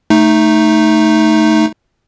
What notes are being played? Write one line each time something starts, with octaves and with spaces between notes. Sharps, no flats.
A3 D#4